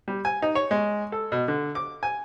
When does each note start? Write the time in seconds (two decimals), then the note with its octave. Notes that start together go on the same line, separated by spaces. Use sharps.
0.08 G3
0.25 G#5
0.42 D#4
0.55 C#5
0.71 G#3
1.12 A4
1.32 B2
1.48 D3
1.75 D6
2.03 G#5